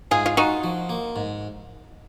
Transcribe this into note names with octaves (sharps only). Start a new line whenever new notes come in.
G#2 F4 G#4
F4
D#4 F4 F#4
F3
A#3
G#2